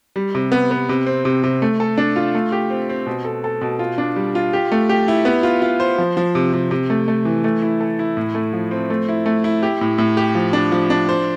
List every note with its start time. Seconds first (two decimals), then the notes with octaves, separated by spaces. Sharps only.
0.16 G3
0.35 C3
0.52 B3
0.71 B3
0.89 C3
1.07 C4
1.25 C3
1.43 C3
1.62 A3
1.80 A4
1.98 D4
2.16 F4
2.35 A3
2.52 G4
2.70 C4
2.89 C4
3.06 B2
3.25 A4
3.44 A4
3.61 B2
3.79 F4
3.98 D4
4.16 G3
4.35 F4
4.53 G4
4.72 A3
4.89 G4
5.08 E4
5.25 B3
5.43 F4
5.62 F4
5.80 C5
5.98 F3
6.17 F3
6.35 C3
6.53 C3
6.71 C3
6.90 A3
7.08 A3
7.25 E3
7.44 A3
7.62 E4
7.81 A4
7.99 E4
8.17 A2
8.34 A3
8.53 F3
8.71 C4
8.90 A3
9.09 E4
9.26 A3
9.44 E4
9.63 G4
9.81 A2
9.98 A2
10.17 G4
10.35 F3
10.53 D4
10.72 F3
10.90 D4
11.09 C5